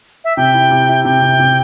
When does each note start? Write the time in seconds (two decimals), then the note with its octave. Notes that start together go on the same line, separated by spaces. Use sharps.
0.24 E5
0.37 C3 G5
0.54 E4
0.71 C3
0.88 E4
1.05 C3 G5
1.22 C3
1.39 C3